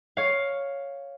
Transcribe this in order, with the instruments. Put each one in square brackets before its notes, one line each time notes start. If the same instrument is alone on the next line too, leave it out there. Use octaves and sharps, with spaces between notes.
[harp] C#5 F5